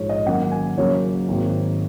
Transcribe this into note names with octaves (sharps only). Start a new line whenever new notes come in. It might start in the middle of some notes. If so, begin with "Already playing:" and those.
Already playing: A#1 G#2 G#3 C#5
D#5
F#2 D#3 A#3 F#5
G#5
F#1 F#2 C#3 F#3 A#3 C#5
G#1 G#2 D#3 A#3